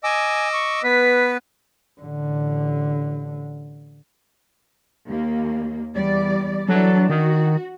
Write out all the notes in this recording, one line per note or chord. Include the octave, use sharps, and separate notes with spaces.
D#5 G#5 D6 E6
C#6
B3 B4 B6
A1 D3
D#2 A#3
E2 G3 D5
E3 F#3 D4 A4
D#3 F#4